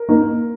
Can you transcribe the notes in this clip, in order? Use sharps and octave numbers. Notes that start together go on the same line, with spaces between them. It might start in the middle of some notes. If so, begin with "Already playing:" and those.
Already playing: A#4
A#3 D#4